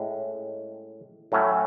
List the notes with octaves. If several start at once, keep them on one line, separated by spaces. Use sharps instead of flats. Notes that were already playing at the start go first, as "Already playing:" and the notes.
Already playing: A2 G#3 C#4
A2 F#3 A3 C#4